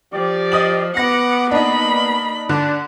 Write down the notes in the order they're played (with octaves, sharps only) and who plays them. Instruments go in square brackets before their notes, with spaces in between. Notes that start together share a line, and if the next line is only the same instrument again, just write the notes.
[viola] F3 [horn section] G4 D5
[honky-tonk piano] D#5 D#6 F#7
[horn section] B3 [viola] F#5 D6 [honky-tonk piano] A#6
[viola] A#3 B5 [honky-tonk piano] D4 D#4
[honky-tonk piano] D3 [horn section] D4